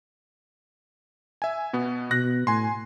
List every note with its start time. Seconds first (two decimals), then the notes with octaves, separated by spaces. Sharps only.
1.42 E5 G#5
1.73 B2 B3
2.11 B2 F#6 A#6
2.47 A2 G#5 C6